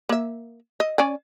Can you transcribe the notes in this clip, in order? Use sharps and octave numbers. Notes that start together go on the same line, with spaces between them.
A#3 E5
D#5
C#4 D5 G#5